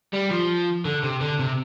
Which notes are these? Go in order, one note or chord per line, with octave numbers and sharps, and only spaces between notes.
G3
F3
D3
C3
D3
C3